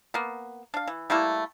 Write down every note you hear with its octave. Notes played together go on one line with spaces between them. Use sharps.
A#3 B3
D4 F5
E3
G3 A3 A#3 E4